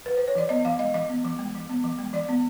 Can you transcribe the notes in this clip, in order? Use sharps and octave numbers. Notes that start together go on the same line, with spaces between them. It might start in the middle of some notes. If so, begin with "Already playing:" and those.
B4
C5
C#5
E3 D5
B3 D#5
E3 F5
G#3 D#5
E3 D#5
B3
E3
G#3
E3
B3
E3
G#3
E3 D5
B3